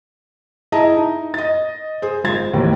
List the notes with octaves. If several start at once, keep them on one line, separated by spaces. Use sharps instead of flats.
E4 G#4 D#5 A5 A#5
D#4
D#5 A6
G#4 C5
G#1 G#3 F4 C5 G#6 A6
D#2 A2 D#3 E3